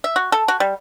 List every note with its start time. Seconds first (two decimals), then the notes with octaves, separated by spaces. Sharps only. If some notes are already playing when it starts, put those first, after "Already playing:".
0.04 E5
0.16 F#4
0.32 A4
0.48 F#4
0.60 G3